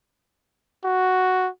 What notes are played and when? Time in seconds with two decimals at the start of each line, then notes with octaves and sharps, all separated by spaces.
0.84 F#4